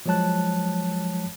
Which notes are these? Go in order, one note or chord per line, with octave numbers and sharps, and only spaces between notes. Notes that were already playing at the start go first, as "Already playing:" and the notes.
F3 F#3 G#3 C#5 A5 F#6